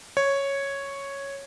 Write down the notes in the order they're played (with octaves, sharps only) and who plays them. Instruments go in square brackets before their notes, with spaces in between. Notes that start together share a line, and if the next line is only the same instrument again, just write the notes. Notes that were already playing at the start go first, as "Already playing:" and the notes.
[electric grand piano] C#5